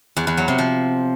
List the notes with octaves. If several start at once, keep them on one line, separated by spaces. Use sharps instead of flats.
E2
E2
F#3
C3
F3